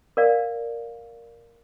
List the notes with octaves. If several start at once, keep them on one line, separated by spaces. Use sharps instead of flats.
A#4 D5 F5